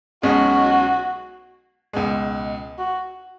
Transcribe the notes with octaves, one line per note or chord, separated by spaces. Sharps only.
B1 B2 G#3 C#4 F#4
C#2 B2 G#3
F#4